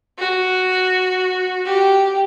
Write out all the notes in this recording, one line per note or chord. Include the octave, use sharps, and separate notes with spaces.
F#4
G4